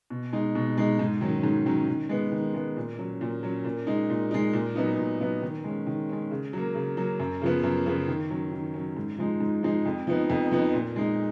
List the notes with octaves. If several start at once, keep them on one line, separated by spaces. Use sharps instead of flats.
B2
G#3 D#4
B2
G#3 D#4
G#2
D#3 F#3 C#4
G#2
D#3 F#3 C#4
D#3
G#3 B3
D#3
G#3 B3
A#2
F#3 C#4
A#2
F#3 C#4
A#2
G#3 D#4
A#2
G#3 D#4
A#2
F#3 B3 D#4
A#2
F#3 B3 D#4
D#3
G#3 C#4
D#3
G#3 C#4
C#3
F#3 A#3
C#3
F#3 A#3
F#2
C#3 F3 B3
F#2
C#3 F3 B3
D#3
F#3 C#4
D#3
F#3 C#4
G#2
F3 G#3 D#4
G#2
F3 G#3 D#4
F2
F3 B3 D#4
F2
F3 B3 D#4
A#2
G#3 D#4